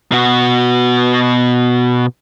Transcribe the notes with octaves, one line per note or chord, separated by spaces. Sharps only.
B2 F#4